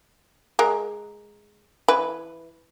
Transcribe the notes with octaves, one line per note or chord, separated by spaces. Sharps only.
G#3 A#4
E3 B4